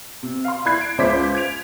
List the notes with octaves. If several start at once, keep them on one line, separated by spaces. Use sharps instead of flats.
C3
F5 C6
E4 D5 B5 F#6 G#6 C7
D7
C#2 C#3 C5 E5 D6 B6
G#6 D7 F7